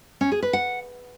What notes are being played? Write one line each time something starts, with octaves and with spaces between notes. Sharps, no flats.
C#4
G#4
B4
F#5